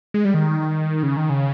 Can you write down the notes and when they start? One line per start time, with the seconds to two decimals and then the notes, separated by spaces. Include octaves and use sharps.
0.14 G#3
0.25 G3
0.34 D#3
1.03 C#3
1.17 D#3
1.30 C#3